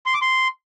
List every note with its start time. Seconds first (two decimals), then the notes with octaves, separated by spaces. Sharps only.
0.06 C6
0.14 D6
0.22 C6